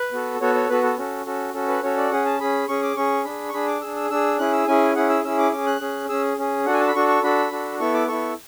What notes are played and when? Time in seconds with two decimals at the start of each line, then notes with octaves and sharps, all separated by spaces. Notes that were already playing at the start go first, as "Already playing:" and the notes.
Already playing: B4
0.12 B3 F#4 A4
0.41 B3 F#4 A4 C#5
0.55 C#5
0.69 B3 F#4 A4 B4
0.83 A4
0.98 C#4 F#4 A4
1.26 C#4 F#4 A4
1.54 C#4 F#4 A4
1.68 B4
1.83 C#4 F#4 A4 C#5
1.97 D5
2.11 C#4 G#4 F#5
2.25 A5
2.40 C#4 G#4 B5
2.68 C#4 G#4 C#6
2.83 D6
2.96 C#4 G#4 C#6
3.25 D4 G#4 B5
3.49 C#6
3.53 D4 G#4 B5
3.67 D6
3.81 D4 G#4 E6
3.96 E6
4.10 D4 G#4 E6
4.39 C#4 E4 G#4 F#6
4.53 E6
4.67 C#4 E4 G#4 G#5
4.95 C#4 E4 G#4 F#5
5.09 E6
5.24 C#4 E4 G#4 E6
5.38 D6
5.52 C#4 G#4 D6
5.67 F#6
5.81 C#4 G#4
6.09 C#4 G#4 E6
6.38 C#4 G#4
6.66 D4 F#4 A4 F#5
6.73 G#5
6.80 A5
6.87 B5
6.95 D4 F#4 A4 C#6
7.08 C#6
7.22 D4 F#4 A4 B5
7.51 D4 F#4 A4
7.80 B3 E4 A4 C#6
7.94 D6
8.08 B3 E4 A4 C#6